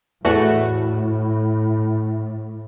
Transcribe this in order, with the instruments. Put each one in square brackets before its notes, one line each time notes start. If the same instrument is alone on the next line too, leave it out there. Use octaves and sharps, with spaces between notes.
[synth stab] E2 A3 F#4 [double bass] A2